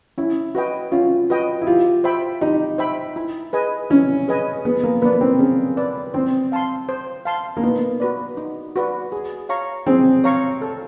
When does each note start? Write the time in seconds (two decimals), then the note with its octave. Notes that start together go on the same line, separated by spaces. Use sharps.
0.18 C#4 E4
0.55 F#4 B4 D#5 G5
0.92 C#4 F4
1.30 F#4 B4 D#5 G5
1.61 E4
1.67 F4 G4
2.04 C5 E5 G5 B5
2.41 D#4 G4
2.78 C5 E5 G5 B5
3.16 E4
3.53 G#4 B4 D#5 G#5
3.90 C#4 E4
4.28 G#4 B4 D#5 G#5
4.65 B3 G#4
4.83 A#3
5.02 B3 B4 D5
5.21 C4
5.39 C#4 G#4
5.77 B4 D5
6.14 C4 C5
6.52 F5 A5 C6
6.89 C5
7.25 F5 A5 C6
7.57 A#3
7.63 B3 D#4
8.00 F#4 B4 D5
8.37 D#4
8.76 F#4 B4 D5
9.12 G#4
9.49 C#5 F5 A#5 C#6
9.87 C4 G#4
10.24 C#5 F5 A#5 C#6
10.62 A4